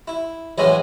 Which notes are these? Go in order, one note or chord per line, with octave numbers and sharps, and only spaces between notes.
E4
A2 E3 F#3 G#3 C#4 E4